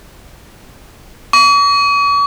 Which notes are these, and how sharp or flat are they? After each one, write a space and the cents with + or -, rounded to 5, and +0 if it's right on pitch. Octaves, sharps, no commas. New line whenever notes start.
C#6 +45